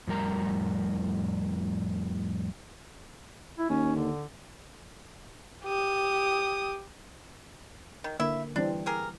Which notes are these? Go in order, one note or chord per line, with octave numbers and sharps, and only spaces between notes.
F2 A2 G3 A#4 A#5
E4
D#2 C#4
D3
G4 D#6
D#3
D3 A#3 E4 E5
E3 G3 C4 D4
G4 G#4 A#4